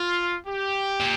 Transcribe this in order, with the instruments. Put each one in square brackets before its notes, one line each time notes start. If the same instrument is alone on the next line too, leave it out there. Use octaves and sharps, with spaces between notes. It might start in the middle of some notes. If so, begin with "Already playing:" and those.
Already playing: [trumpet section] F4
G4
[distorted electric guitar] A#2